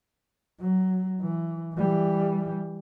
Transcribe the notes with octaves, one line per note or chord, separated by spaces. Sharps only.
F#3
E3
E3 G3